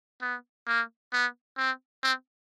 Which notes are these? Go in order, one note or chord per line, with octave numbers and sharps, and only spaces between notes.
B3
A#3
B3
C4
C4